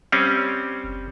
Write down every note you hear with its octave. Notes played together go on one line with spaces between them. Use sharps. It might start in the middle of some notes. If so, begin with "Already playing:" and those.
G3 C4 C#4
F#1